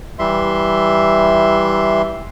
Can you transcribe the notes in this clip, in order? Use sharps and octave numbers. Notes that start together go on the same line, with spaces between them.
E3 G3 E5 C6